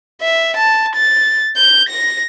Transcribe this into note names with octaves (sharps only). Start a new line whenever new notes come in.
E5
A5
A6
G6
A#6